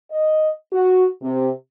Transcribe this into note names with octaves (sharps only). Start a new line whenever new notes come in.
D#5
F#4
C3